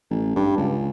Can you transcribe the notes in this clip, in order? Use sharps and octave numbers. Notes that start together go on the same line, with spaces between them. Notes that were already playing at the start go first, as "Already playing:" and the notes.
A1
G2
C#2